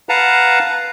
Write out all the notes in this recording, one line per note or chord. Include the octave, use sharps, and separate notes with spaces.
B4 F5 F#5 A5 A#5